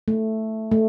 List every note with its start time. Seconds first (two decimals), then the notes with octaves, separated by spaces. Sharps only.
0.08 A3
0.71 A3